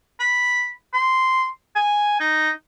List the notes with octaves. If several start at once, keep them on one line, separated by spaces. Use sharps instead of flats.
B5
C6
G#5
D#4